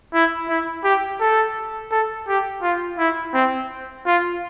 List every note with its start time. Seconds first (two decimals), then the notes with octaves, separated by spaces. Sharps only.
0.14 E4
0.48 E4
0.84 G4
1.20 A4
1.91 A4
2.28 G4
2.62 F4
2.98 E4
3.34 C4
4.06 F4